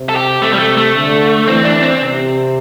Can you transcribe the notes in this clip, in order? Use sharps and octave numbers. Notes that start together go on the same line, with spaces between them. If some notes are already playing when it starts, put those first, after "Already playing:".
Already playing: C3
A4
G4
C3 A3
G3
A3
A3
D3
E3 C4
D4
C4
C3